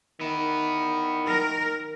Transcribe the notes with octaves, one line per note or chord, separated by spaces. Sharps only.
D#3 B3 E4
A#4